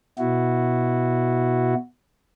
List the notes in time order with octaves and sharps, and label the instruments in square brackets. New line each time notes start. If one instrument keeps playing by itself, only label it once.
[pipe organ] B2 E4 F#4